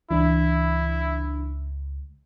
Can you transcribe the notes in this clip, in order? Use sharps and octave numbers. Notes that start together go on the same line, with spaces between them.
C#2 E3 D4 E4